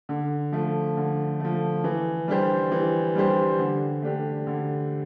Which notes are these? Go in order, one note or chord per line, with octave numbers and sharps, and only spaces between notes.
D3
F3 A3
D3
F3 A3
E3
G3 D4 G4 C5
E3
G3 D4 G4 C5
D3
A3 D4 G4
D3